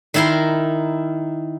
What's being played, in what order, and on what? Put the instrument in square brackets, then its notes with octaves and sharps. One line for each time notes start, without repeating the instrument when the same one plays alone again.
[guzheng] D#3 D#4 E4 A#4 C6